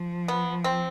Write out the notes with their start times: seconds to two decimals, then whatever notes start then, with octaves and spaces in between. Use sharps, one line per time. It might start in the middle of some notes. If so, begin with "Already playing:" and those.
Already playing: F3
0.28 B3
0.64 C4